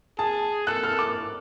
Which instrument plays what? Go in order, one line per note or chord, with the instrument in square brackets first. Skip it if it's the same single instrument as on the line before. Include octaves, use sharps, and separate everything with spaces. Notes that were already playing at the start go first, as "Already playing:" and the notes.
[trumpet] G#4 [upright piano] A5
[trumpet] A4 [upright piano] F#6
[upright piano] F6
D6